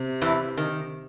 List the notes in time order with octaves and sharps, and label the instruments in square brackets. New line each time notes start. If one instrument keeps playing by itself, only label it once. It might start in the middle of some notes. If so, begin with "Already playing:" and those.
Already playing: [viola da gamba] C3
[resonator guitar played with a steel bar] E2 E3
D#3